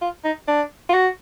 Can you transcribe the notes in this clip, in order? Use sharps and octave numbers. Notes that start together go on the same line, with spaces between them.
F4
D#4
D4
F4
F#4